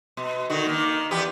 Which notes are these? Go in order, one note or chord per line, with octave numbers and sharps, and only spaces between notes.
B2
D3 D#3 F#4
D#3 A#3
E2 B3 G4